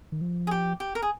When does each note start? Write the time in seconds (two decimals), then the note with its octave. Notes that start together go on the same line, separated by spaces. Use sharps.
0.12 D#3
0.21 F3
0.47 G#4
0.51 G4
0.80 G4
0.95 A#4
1.02 G#4